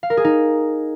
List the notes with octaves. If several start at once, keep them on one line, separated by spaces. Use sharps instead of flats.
F5
A#4
G#4
D#4